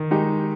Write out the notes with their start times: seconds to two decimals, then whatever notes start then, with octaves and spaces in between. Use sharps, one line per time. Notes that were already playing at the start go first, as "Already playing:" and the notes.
Already playing: D#3
0.11 G#3 D#4 G4